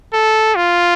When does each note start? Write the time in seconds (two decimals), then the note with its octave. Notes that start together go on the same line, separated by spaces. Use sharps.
0.13 A4
0.56 F4